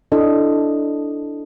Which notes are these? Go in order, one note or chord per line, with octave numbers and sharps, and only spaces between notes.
D4 E4 A4 D#5